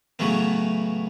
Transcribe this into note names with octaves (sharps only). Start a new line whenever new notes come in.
A2 C#3 E3 F#3 A3 B3